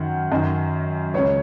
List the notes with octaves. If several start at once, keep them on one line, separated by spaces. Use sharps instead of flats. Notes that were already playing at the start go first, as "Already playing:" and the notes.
Already playing: F#2 D#3 F#5
F#2 D#3 D#5
C#2 C#3 C#5